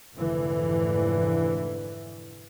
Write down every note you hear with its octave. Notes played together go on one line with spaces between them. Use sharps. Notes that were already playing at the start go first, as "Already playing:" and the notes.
F1 G#2 D3 E3